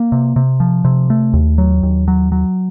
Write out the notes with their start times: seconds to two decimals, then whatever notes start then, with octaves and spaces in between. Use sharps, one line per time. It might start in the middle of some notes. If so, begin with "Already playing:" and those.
Already playing: A#3
0.12 C3
0.36 C3
0.60 F3
0.85 C3
1.10 A3
1.33 D#2
1.58 F#3
1.83 D#2
2.08 F#3
2.32 F#3